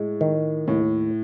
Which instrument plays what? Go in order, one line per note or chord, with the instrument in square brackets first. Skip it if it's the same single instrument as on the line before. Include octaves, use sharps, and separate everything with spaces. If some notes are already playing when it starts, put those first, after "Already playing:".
Already playing: [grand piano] A2 [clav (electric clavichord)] G#3
[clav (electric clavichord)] D#3
[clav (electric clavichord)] D#2 [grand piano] A2